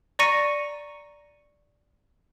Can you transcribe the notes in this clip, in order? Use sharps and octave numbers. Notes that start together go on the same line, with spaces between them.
D5 A#5 C#6 A#6 C#7 D#7